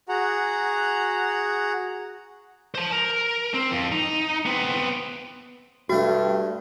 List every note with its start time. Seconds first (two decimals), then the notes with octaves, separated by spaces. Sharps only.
0.09 F#4 G#4 F#5 A#5
2.75 C5 A5
2.92 A#4
3.54 C4
3.71 F2
3.92 D#4
4.46 B3 C4
5.89 G2 G3 A3 D4 F#4